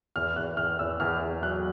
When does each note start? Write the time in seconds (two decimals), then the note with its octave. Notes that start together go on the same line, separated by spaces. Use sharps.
0.16 E2 F6
0.36 E2 F#6
0.57 E2 F6
0.79 E2 E6
1.00 E2 F6
1.21 E2
1.42 F#3 F#6